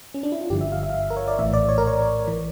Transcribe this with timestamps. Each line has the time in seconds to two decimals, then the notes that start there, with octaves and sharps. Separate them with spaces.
0.14 C#4
0.23 D4
0.32 E4
0.41 F4
0.50 G1 G2 D3 F3 G4
0.61 E5
0.72 F5
0.83 E5
0.90 F5
0.94 E5
1.10 A#4
1.17 C#5
1.28 D5
1.39 A#1 A2 E3 E5
1.53 D5
1.69 C#5
1.78 A#4
1.87 C#5
2.27 E3